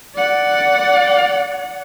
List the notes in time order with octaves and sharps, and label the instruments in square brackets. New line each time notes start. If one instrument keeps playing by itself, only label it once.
[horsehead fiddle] D5 F#5